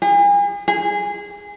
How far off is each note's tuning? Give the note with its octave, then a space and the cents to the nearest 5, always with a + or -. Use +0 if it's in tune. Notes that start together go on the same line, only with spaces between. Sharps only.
G#4 -40
G#4 -20